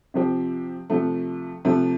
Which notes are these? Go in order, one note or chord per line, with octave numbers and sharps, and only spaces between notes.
C3 F3 C4 G4
C3 F3 A3
C3 F3 A3